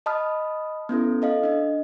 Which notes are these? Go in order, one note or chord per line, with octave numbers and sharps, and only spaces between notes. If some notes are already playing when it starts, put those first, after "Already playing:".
D#5 A5 B5 D#6 F6
B3 C#4 E4 A4
A4 D#5 F5
D4 D#5